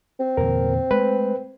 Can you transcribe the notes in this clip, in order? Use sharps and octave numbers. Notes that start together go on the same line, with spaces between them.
C4
E2 A#2 D3 A#4
G#3 A3 B4